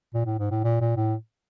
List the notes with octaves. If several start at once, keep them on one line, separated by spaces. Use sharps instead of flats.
A#2
A2
G#2
A2
A#2
A#2
A2